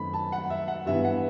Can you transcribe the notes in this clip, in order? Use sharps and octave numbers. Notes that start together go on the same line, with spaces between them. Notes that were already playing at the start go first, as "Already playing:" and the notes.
Already playing: F#2 D#3 A3 C4 B5
A5
F#5
E5
F#5
G2 E3 B3 E5
F#5